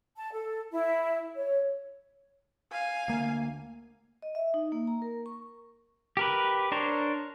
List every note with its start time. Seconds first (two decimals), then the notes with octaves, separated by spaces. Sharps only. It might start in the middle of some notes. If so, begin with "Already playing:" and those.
0.16 A5
0.33 A4
0.72 E4
1.36 C#5
2.72 F5 G#5
3.08 D2 A#3
4.22 D#5
4.35 E5
4.54 D#4
4.72 A#3
4.87 A#5
5.02 A#4
5.26 C#6
6.17 G4 A#4 B4
6.72 D4 A#4 C5 C#5